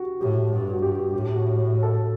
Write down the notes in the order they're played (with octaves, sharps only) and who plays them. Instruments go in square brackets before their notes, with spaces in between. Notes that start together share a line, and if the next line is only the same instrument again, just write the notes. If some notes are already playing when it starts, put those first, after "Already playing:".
Already playing: [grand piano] F#4 G4
[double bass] A2 [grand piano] G4
[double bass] G2 [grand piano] F#4
[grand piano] F#4
[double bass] G2 [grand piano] G4
[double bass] A2 [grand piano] G4
[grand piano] F#4
A4